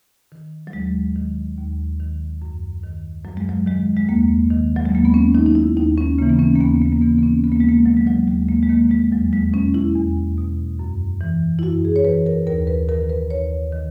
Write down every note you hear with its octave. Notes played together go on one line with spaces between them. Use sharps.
D#3
F#3
D#2 G#3
D#3
D#2
D#3
F#2
D#3
F#2 F#3
G#3
F#3
D#3 G#3
G#3
D#2 A#3
D#3
F#3
G#3
D#2 A#3
B3
C#4
D#3 D#4
D#4
E4
D#2 D#4
C#4
C#3 E3 A#3
B3
C#4
A#3
D#2 B3
A#3
A#3
C#3 E3 B3
B3
C#4
D#2 B3
A#3
G#3
A#3
D#3 F#3
G#3
F#3
D#2 G#3
A#3
G#3
D#3 A#3
G#3
E2 F#3
G#3
B2 C#4
E4
E2
B2
F#2
E3
E4
F#2 F#4
G#4
C#5
E3 B4
A#4
D#2 A#4
B4
D#3 A#4
B4
D#2 C#5
D#3